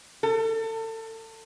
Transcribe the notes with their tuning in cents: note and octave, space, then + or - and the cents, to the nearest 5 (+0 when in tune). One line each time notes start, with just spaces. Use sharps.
A4 +30